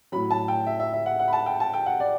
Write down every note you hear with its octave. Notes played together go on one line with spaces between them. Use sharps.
A2 F#3 B5
A5
G5
E5
E5
E5
F#5
F#5
B5
A5
G5
A5
G5
F#5
D5